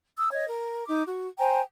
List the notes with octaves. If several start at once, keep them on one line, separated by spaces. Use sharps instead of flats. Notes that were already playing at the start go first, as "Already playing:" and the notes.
D#6 E6
C#5 D#5
A#4
D#4 D6
F#4
C5 G5 G#5 A#5